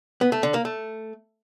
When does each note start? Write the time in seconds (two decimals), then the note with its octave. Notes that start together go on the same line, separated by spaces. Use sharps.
0.21 B3
0.32 A3
0.43 D3
0.54 A#3
0.65 A3